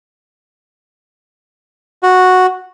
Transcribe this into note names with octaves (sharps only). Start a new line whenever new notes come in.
F#4